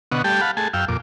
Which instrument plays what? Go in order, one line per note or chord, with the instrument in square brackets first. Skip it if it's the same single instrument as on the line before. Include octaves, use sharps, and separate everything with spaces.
[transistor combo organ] B2 D3 B3 D#5 F#5 C#6
G3 A3 G4 G5 A5
F5 F#5 A5 B5
A3 G#4 G#5 A5
F#2 F5 G5 E6
F2 A#2 D6